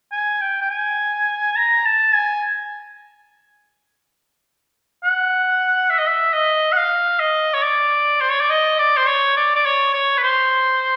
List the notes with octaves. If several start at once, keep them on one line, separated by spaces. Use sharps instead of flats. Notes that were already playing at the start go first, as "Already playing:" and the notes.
G#5
G5
G5
G#5
A#5
A5
G#5
F#5
E5
D#5
E5
D#5
F#5
F5
D#5
C#5
D5
C5
C#5
D5
D#5
D5
C5
C#5
D5
D5
C#5
C#5
B4
C5